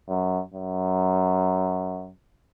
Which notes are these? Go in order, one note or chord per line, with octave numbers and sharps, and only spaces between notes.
F#2
F#2